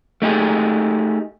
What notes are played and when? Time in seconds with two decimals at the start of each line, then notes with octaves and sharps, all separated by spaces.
0.22 A3 D#4 G4 G#4